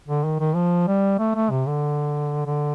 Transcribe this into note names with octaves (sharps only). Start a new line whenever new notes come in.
D3
D#3
D#3
F3
G3
A3
A3
C3
D3
D3